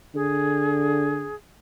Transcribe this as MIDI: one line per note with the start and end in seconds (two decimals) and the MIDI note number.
0.15 1.30 50
0.15 1.35 68